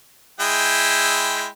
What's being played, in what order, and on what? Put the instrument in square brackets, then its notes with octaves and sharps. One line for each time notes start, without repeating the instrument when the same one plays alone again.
[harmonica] G#3 E4 G5